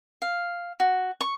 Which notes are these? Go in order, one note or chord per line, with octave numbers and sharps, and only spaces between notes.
F5
F#4
C#6